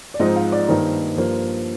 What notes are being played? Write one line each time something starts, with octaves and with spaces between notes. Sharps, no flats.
D5
G#2 F3 C4 D#4 D#5
F5
D5
G2 D#3 A#3 D#4 C5
G2 F3 A#3 C5